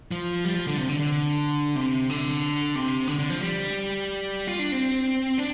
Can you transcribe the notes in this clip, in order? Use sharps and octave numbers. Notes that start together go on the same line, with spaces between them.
F3
G3
F3
D3
C3
D3
D3
C3
D3
C3
D3
D3
F3
G3
F4
D4
C4
D4